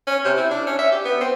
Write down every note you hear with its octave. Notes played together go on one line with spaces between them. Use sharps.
C#4
C3
E4
D4
C#4
E5
G4
B3
C4